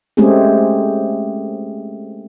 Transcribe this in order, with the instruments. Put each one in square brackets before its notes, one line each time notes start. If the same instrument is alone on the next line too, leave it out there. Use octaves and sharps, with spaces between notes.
[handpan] G#3 A3 C4 C#4 G4 G#4